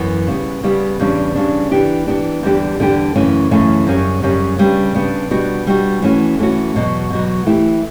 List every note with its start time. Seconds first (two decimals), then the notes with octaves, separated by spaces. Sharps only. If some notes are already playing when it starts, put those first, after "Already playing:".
Already playing: F#2 E3 B3
0.27 C#3 G3 B3
0.63 C#3 G3 B3
1.00 E2 C#3 G3 D4
1.35 E2 C#3 G3 D4
1.71 E3 B3 D4 G4
2.07 E3 B3 D4 G4
2.43 E2 D3 G3 D4 G4
2.79 E2 D3 G3 D4 G4
3.15 F#2 C#3 E3 A3 C#4
3.51 F#2 C#3 E3 A3 C#4
3.87 F#2 C#3 G3 C#4
4.23 F#2 C#3 G3 C#4
4.59 C#3 G3 B3 D4
4.95 C#3 G3 B3 D4
5.31 B2 G3 B3 D4 F#4
5.67 B2 G3 B3 D4 F#4
6.02 E3 A3 C#4 F#4
6.39 E3 A3 C#4 F#4
6.75 E2 B2 F#3
7.11 E2 B2 F#3
7.46 E3 A3 E4 G4